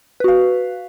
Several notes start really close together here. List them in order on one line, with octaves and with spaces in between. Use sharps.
B4 F#4 F5